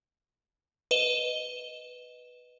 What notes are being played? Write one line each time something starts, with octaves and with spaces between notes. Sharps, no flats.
B4 D#5 E7 G7